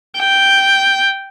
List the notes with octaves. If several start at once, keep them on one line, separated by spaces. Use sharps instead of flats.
G5